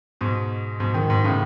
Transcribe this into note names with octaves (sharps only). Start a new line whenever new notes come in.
G#2 B2
G#2 B2
B2 D#3
G#2 B2
A2 C#3